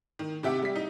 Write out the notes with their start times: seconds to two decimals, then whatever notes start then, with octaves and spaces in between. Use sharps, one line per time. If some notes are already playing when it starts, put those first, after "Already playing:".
0.19 D#3
0.43 C3 G4 E5 F#5 D6
0.63 G3 B6
0.76 D#4